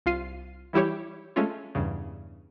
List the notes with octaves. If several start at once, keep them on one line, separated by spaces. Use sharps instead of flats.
C2 F4 C7 D#7
E3 G3 E4 G4 C#5
G#3 A3 C#4 F4
E2 G2 C#3